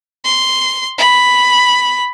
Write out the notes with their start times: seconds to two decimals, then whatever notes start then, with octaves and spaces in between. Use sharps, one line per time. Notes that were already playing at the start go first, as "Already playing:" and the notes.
0.25 C6
0.98 B5